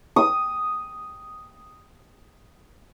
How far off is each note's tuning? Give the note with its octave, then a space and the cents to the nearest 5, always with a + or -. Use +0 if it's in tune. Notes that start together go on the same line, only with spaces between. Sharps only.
D#6 +0